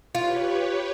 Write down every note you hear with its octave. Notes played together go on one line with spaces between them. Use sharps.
F4 G4 B4 C#5